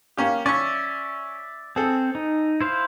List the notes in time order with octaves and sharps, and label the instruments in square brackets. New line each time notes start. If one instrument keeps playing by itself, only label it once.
[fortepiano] A#3 C#4 G4
[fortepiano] C#4 C#6 [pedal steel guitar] D5 E5
[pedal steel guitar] C4 [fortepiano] G#4 A4
[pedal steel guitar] D#4
E4 C5 F5